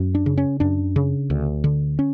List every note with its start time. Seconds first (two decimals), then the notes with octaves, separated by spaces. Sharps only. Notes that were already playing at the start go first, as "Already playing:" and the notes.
Already playing: F#2
0.15 D4
0.26 C#3
0.38 C#4
0.60 F#2 D4
0.96 C#3
1.30 D2
1.64 D3
1.99 C#4